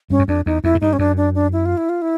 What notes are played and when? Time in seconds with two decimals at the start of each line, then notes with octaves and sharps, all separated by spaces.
0.10 G2 C#4
0.19 F#2
0.28 F2 D4
0.46 E2 D#4
0.64 F2 E4
0.75 G#2
0.81 G2 D#4
0.93 C#4
0.99 F#2 D4
1.17 D4
1.35 D4
1.53 E4
1.66 F4
1.77 E4
1.89 F4
2.02 E4